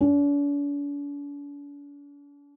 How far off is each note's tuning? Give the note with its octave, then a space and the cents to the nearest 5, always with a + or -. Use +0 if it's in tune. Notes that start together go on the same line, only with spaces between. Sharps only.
D4 -45